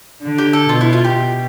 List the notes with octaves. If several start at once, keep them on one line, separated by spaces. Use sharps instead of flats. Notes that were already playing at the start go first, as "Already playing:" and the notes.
D3
G4
A4
B2 F4
E4
F4
G4
B2